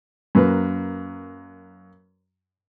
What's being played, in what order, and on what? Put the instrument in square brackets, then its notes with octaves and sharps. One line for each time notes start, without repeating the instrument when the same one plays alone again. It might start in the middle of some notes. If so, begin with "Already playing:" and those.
[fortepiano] F#2 A#3 B4